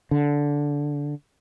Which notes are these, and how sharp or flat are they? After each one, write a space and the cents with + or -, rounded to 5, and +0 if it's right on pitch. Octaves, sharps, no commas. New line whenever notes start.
D3 -10